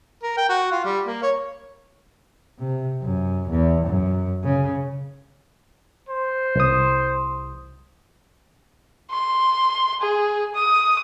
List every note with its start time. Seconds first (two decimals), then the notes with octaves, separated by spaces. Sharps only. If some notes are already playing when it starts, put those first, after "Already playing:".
0.23 A#4
0.37 G5
0.49 F#4
0.72 F4
0.85 G3
1.07 A#3
1.23 C#5
2.59 C3
3.02 F#2
3.50 E2
3.86 F#2
4.43 C#3
6.09 C5
6.55 C2 D#6
9.11 C6
10.01 G#4
10.55 D#6